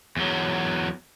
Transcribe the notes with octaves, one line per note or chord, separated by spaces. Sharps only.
E2 F#3